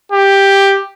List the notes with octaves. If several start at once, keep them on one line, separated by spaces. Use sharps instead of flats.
G4